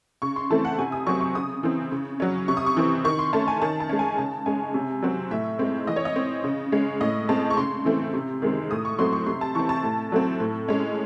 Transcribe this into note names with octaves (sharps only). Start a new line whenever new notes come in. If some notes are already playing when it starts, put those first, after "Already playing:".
C#3 C#6
C6
E3 A3 C4 A5
F#5
C3 G#5
D#6
F#3 C4 C#6
C#6
C#3 D#6
E3 C4
C#3
F#3 C#4
C3 C#6
D#6
C#6
E3 C4
D#3 C#6
C6
A3 C#4 A5
G#5
D#3 A5
A5
G#3 C#4
G#5
C#3 A5
G#3 C#4 G#5
C3
F#3 C4
A2 E5
G#3 C4
E3 D#5
C#5
D#5
C4
C#3
G#3 C#4
A2 D#5
G#3 C4 A5
C#6
C#3 C6
E3 A3 C4
C3
D#3 G#3 C4
A2 D#6
C#6
F#3 A3 C4 C6
C#6
C3 C6
A5
E3 C4 C#6
A5
A2
F#3 A3 C4
A2
G#3 C#4